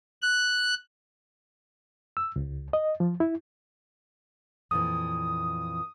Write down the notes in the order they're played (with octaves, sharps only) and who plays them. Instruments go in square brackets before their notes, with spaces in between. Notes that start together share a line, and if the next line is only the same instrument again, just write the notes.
[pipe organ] F#6
[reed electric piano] E6
C#2
D#5
F3
E4
[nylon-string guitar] F2 A#2 E3 [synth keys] D#6